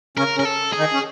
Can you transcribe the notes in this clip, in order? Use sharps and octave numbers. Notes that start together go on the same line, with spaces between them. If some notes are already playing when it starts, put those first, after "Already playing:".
C#3 C#4 A#4
C#3 C#4 A#4
A4
G#4
D#3 D#4
C#4